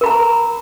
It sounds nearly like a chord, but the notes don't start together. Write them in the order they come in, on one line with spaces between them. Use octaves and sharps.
A#4 B5 A#5